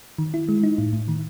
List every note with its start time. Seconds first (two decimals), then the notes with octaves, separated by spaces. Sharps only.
0.19 D#3
0.34 E4
0.49 G#3
0.64 D#4
0.78 A2
0.93 A2
1.08 D#3